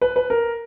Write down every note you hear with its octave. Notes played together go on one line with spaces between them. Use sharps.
B4
B4
A#4